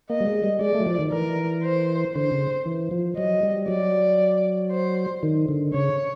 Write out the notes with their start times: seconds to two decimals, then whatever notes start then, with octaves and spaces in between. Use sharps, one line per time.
0.10 A#3 D#5
0.20 G3
0.26 G#3
0.44 G3
0.61 G#3 D5
0.75 A3
0.80 F#3
0.86 F3
0.99 D#3
1.12 E3 A#4
1.63 C5
2.15 D3 C5
2.32 C#3
2.66 E3
2.91 F3
3.17 F#3 D#5
3.43 G3
3.68 F#3 D5
4.72 C5
5.23 D#3
5.48 D3
5.73 C#3 C#5